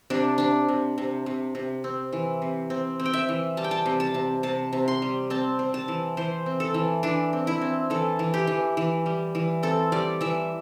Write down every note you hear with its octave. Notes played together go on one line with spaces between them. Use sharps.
C3 D4
C3 D4
C3
C3
C3
C3
C4
E3
C3
C4
C4
G5
E5
E3
G3 A5
G5
A5
C3
A5
C3
C3 A5
C3
C6
G3
C4 A5
C4
A5
E3
E3 C5
C4
A4
E3
E3 D4
C4
E4
C4
E3 A4
E3
G4
E3
E3
G3
E3
C4 A4
G3 D5
E3 E5